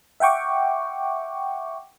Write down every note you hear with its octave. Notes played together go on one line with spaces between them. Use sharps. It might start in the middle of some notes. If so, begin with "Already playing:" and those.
E5 F#5 G5 C#6 D6